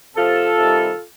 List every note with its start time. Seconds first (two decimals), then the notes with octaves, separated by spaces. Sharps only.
0.16 C3 F3 F4 A4
0.57 C3 D#3 G3